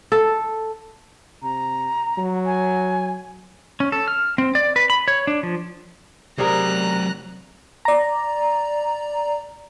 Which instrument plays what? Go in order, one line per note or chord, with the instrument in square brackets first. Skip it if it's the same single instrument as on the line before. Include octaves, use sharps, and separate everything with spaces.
[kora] A4
[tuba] C3 [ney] A#5
[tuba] F#3
[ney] G#5
[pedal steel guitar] C#4
A4
F6
C4
D5
B4
B5
C#5
D4
F3
[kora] C3 G#4 A#4 [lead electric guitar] F#3 D5 [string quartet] A#5 F#6
[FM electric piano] D5 A#5